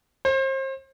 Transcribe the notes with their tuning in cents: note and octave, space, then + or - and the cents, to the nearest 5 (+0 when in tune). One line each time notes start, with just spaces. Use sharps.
C5 +35